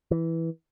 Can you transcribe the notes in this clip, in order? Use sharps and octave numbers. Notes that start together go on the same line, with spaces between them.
E3